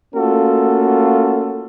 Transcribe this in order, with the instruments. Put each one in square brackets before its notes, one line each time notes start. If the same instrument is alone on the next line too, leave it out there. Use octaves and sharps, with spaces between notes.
[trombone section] A3 A#3 C#4 F4 F#4 A4